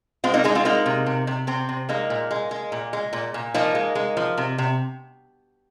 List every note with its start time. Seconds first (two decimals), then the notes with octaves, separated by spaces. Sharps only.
0.24 G#3 C4 F4
0.34 A#3 D#4
0.44 G#3 D#4 G#4
0.55 C4 F4
0.65 G#3 A#3 D#4
0.86 C3
1.06 C3
1.27 C3
1.47 C3 C4
1.69 C3
1.89 G#3 A#3 D#4
2.10 A#2
2.31 G#3
2.51 G#3
2.72 A#2
2.93 G#3
3.13 A#2
3.34 A#2
3.54 F3 A#3 D#4
3.75 G#3
3.95 G#3
4.17 F3
4.38 C3
4.58 C3